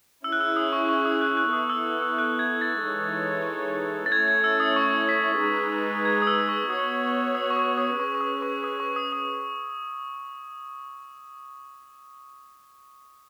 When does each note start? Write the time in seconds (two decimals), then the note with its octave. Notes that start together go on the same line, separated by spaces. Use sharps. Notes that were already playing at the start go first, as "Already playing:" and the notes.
0.24 C#4 E4 G#4 E6
0.32 F#6
0.41 E6
0.56 D#6
0.73 C#6
0.89 C#6
1.05 D#6
1.21 F#6
1.37 F#6
1.53 B3 E4 A4 D#6
1.70 E6
2.02 E6
2.18 F#6
2.39 G#6
2.61 A6
2.83 E3 G#3 D#4 A4 C#5
4.06 A6
4.12 A3 C#4 E4 A4 C#5 G#6
4.28 G#6
4.44 E6
4.60 D#6
4.76 C#6
5.09 B6
5.40 G#3 D#4 G#4 B4
6.05 G#6
6.22 D#6
6.27 E6
6.49 C#6
6.70 B3 F#4 C#5 D#6
7.35 D#6
7.51 C#6
7.56 D#6
7.78 D#6
7.99 C#4 G#4 B4 C#6
8.15 C#6
8.21 D#6
8.42 C#6
8.64 D#6
8.80 C#6
8.96 D#6
9.12 D#6